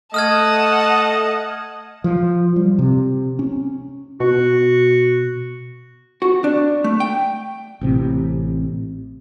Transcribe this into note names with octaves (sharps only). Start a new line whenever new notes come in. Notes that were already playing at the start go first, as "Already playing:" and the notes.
A3 D#5 F#5 A5 D#6 F6 G#6
F3
G3
C3
C#4
B2 F#4
F#4
D4
A3
G5
A1 C3 C4